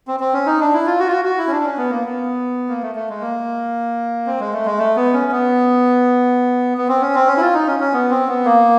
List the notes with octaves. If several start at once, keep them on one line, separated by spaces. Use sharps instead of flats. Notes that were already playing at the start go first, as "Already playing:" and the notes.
C4
C4
C#4
D#4
D4
E4
F4
F#4
F4
F#4
F#4
E4
C#4
D4
C#4
B3
A#3
B3
A#3
A3
A3
G#3
A#3
C4
G#3
A3
G#3
A3
B3
C#4
B3
B3
C4
C#4
C4
C#4
E4
F4
D#4
C#4
C#4
B3
C4
B3
A#3